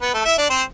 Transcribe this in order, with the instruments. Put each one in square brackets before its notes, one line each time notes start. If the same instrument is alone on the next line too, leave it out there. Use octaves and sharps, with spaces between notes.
[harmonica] B3 B4
A3 A4
E4 E5
D4 D5
C4 C5